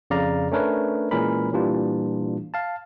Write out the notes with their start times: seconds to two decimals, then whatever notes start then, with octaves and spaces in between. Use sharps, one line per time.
0.10 F2 C#3 D5 F5 A#5
0.51 A3 C#4 D4 A#4 B4 C#5
1.11 A#2 E3 G#3 C#4 A#4 B5
1.53 A#2 E3 G3 D4 F4
2.54 F5 A5